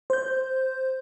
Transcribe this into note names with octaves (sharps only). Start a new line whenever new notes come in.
C5 G6